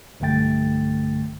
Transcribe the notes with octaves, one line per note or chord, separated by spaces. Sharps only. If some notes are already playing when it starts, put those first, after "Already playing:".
B1 G2 D3 A3 G5 A6